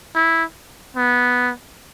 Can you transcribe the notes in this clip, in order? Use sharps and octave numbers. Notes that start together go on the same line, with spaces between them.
E4
B3